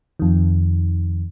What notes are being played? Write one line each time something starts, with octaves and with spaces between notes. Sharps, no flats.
F2 D#3